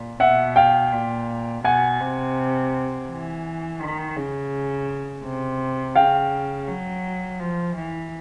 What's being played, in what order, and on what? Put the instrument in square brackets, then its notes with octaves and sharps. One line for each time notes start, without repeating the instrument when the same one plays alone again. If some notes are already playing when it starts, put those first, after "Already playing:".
Already playing: [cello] A#2
[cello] B2 [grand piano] E5 F#5
[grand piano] F5 G5
[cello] A#2
[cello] B2 [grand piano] F#5 G#5
[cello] C3
E3
D#3
C#3
C3
[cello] C#3 [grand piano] F5 G5
[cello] F#3
F3
E3